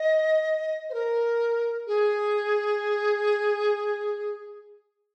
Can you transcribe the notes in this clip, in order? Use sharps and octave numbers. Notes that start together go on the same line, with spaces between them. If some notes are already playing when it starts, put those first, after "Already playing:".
Already playing: D#5
C5
A#4
G#4